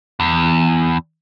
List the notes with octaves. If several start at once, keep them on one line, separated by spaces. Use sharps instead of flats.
E2